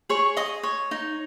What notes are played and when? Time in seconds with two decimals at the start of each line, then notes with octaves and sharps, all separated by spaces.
0.09 G#4 C#5 C#6
0.37 G#4 D#5 D#6
0.63 C#5
0.91 D#4